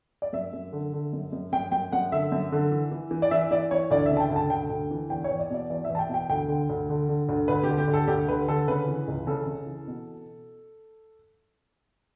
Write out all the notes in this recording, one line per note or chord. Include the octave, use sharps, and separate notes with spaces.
D5
F#2 E5
F#2
D3
D3
F#2
F#2
F#2 G5
F#2 G5
F#2 F#5
D3 E5
F#2
D3
E3
E3
E3
D5
E3 E5
E3 D5
E3 C#5
D2 D5
E5
C#3
A5
G5
D2
A5
D2 G5
D2
E3
E2 G5
C#5
E2
D5
B2 D5
E2 D5
E2 E5
A5
G5
B2
G5
D2 G5
D3
D2
D3
D3
D2
D2 B4
D3 G4
G4
D2
A4
D2 G4
D3 B4
D3 A4
C#3 B4
E3
C#2
C#3 A4
C#3
E3
B2